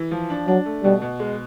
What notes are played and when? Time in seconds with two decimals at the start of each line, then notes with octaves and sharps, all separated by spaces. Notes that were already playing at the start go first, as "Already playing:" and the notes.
Already playing: E3
0.11 F3
0.30 D4
0.47 F#3 D4
0.65 A3
0.84 B2 G3
1.02 B2
1.20 G#3